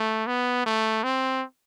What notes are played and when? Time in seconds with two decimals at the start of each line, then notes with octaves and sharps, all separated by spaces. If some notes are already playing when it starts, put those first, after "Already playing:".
Already playing: A3
0.27 B3
0.66 A3
1.04 C4